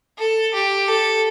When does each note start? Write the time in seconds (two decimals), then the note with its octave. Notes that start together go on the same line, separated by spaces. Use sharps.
0.18 A4
0.54 G4
0.88 A4